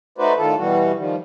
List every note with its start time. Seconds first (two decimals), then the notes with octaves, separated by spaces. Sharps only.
0.18 A3 D#4 F#4 B4 C5 D5
0.37 A2 D#3 F4 A4
0.57 B2 E3 G3 F#4
0.96 D#3 F3 G3